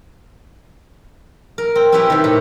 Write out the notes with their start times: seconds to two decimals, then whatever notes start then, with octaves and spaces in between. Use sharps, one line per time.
1.58 A#4
1.75 C4
1.92 C4 C#4 E4 G4 B4 C#5
2.10 C3 D#3
2.24 A2